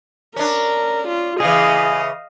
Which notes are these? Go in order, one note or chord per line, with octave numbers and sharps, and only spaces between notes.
C#4 D4 A#4
F4
C#3 E3 G#4 D#5 F5